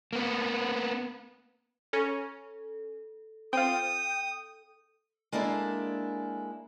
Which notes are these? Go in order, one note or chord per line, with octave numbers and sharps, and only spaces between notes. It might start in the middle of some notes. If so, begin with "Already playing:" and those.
A#3 B3
C#4 A4
C4 F4 G5 D#6
G#3 A#3 D4 E4 A4